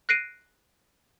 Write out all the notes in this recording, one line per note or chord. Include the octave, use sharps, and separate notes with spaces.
F#6 A#6 C7 D7 D#7